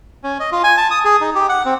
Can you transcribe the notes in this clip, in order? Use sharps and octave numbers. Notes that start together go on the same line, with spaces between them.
C#4
D#5
F4
G#5
A5
D#6
G#4
D#4
G4
F#5
C4